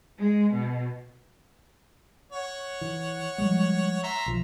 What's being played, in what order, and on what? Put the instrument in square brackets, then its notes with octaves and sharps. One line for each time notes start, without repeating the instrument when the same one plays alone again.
[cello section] G#3
B2
[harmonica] C#5 F#5
[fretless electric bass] E3
F3 G3 G#3
[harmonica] E5 A#5 C6
[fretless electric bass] B1 F3